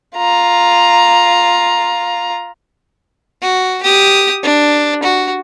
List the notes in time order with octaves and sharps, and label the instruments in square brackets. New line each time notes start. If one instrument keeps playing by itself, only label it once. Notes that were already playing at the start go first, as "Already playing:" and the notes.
[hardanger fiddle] F4 A#5
F#4
G4 D#6
D4
F#4